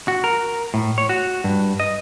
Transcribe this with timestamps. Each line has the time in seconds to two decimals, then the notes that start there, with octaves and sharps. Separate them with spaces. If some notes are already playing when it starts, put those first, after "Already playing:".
0.08 F#4
0.24 A#4
0.74 A2
0.98 C#5
1.09 F#4
1.44 G2
1.80 D#5